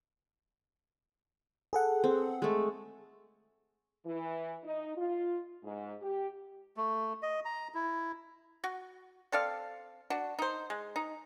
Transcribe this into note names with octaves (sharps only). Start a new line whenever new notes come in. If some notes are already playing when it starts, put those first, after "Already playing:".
G#4 A4 F#5
C4
G#3 A3
E3
D#4
F4
G#2
G4
A3
D#5
A#5
E4
F#4
C4 A4 D5 F5
D4 F#4
D#4 C5
G#3
D#4